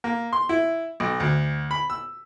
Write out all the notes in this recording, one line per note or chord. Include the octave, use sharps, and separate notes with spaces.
A#3
C6
E4
B1
D2
B5
E6